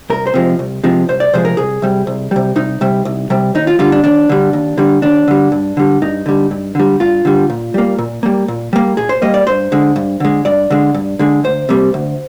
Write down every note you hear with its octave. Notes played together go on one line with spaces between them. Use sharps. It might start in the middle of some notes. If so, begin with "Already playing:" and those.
C2 A#4
C5
C3 F3 G#3
C2
C3 F3 G#3
C2 C5
D5
C3 F3 G#3 C5
A#4
C2 G#4
C3 G3
C2
C3 G3
C2 D#4
C3 G3
C2
C3 G3
D#2 D#4
F4
D3 G3 F4
D4
D#2 D4
D3 G3
D#2
D3 G3
D#2 D4
D3 G3
G2
D3 G3
G2 D#4
D3 G3
G2
D3 G3
G2 F4
D3 G3
A#2
G3 A#3
A#2
G3 A#3
A#2
G3 A#3
A#2 G#4
C5
G3 A#3 D#5
D5
G2 C5
D3 G#3
G2
D3 G#3
G2 D5
D3 G#3
G2
D3 G#3
D2 C5
C3 G3 A#3
D2